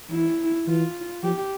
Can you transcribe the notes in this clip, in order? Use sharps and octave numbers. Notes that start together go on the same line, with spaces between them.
E3 E4
E3 F4
F3 G4